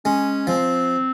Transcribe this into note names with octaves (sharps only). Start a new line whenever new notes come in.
G#3 C#4
F3 C4